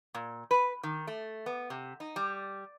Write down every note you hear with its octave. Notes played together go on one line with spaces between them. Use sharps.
A#2
B4
D#3
A3
B3
C3
D#4
G3